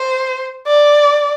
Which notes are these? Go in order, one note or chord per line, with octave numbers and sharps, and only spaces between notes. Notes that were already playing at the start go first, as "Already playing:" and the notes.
Already playing: C5
D5